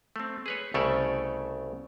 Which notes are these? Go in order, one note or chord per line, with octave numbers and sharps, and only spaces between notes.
A3 C4
G#4 B4 C#5
C2 C#3 A3 A4 C#5 D5